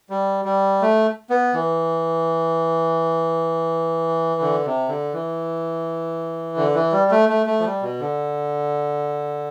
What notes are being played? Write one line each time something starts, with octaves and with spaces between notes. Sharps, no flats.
G3
G3
A3
B3
E3
D3
C3
D3
E3
D3
E3
G3
A3
A3
A3
F3
G3
B2
D3